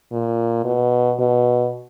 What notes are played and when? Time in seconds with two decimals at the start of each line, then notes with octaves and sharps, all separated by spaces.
0.11 A#2
0.64 B2
1.19 B2